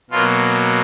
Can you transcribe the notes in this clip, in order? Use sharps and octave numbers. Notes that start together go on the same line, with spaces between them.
B2 F#3 A#3 F4